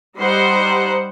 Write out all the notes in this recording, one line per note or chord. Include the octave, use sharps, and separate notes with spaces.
G3 D#4 C5 F#5